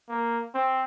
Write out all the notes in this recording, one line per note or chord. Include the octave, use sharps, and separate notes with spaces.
A#3
C4